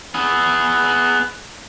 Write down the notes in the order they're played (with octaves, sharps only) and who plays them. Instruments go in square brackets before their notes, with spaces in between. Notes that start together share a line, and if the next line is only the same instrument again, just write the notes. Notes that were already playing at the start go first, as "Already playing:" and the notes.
[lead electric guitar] B3 G#4